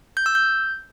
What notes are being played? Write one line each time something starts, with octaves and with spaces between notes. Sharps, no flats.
G6
E6
G6